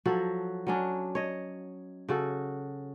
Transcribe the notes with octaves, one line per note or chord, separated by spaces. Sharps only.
F3 F#3 F#4 A4
F#3 C#4 D4
C#5 D#5
C#3 F#4 A4